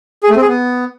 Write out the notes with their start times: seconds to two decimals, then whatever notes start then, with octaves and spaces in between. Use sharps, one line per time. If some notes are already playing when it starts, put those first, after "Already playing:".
0.23 G#4
0.30 A3
0.36 C4
0.42 G#4
0.48 B3